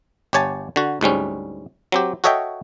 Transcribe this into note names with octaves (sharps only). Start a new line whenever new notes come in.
G1 G4 C#5 G#5 A5
D3 F#4
D2 G#2 G3 C#4
F#3 C4 G4
F#4 A4 C#5 D#5 E5 G5